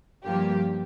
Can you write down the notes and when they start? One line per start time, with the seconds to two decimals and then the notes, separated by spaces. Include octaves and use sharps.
0.24 G2 F3 A#3 G4